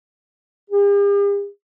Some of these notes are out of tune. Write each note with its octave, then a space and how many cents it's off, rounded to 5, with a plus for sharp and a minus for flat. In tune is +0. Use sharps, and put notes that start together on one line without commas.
G4 +45